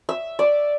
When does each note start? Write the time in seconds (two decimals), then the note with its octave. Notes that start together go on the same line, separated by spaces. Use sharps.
0.09 E5
0.39 D5